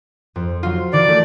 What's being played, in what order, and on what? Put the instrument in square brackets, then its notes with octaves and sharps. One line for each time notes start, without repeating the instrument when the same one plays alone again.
[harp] F2
F#3 F4
[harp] D#3 E3 [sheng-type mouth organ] D5
[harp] A3